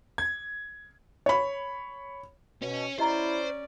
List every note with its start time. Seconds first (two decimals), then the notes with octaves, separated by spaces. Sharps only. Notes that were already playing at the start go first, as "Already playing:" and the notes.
0.18 G#6
1.26 C#5 B5
2.62 B2 C#4
2.98 C#4 E4 G4 C5 D5 D#5 A#5